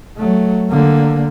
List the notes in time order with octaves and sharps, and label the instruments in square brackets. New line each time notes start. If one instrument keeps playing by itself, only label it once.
[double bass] F#3 A3
D3 A#3